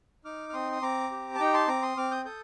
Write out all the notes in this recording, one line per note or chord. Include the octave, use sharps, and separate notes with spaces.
D#4 D6 F6
F6
C4 C6 D#6
D#6
C4 A#5 D6
G4
A5
D#4 G5 A#5
A5 C6
C4 A#5 D6
C6 D#6
C4 D6 F6
D#6 G6
A4 D#6 G6